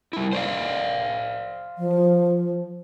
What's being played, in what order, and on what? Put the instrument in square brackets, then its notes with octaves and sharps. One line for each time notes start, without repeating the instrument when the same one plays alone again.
[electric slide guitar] G3 E4
C5 D5 F5
[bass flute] F3